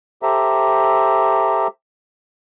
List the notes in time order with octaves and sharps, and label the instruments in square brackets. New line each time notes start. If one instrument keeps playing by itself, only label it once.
[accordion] G4 A4 C5 E5 A#5